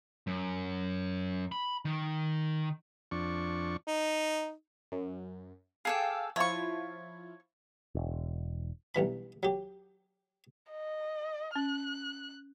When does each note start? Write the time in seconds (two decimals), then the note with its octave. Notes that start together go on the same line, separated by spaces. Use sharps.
0.27 F#2
1.52 B5
1.85 D#3
3.11 F2 D4 C#6
3.87 D#4
4.92 F#2
5.85 G#4 A4 F5 G5 D6 E6
6.36 F3 E4 F4 C#5 C#6
7.95 E1
8.95 B1 G2 E3 B5
9.43 F#3 G4
10.71 D#5
11.56 C#4 F#6